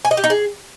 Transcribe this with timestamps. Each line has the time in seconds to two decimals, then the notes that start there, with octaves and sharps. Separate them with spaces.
0.05 G#5
0.11 D#5
0.17 G4
0.24 D#4
0.30 G#4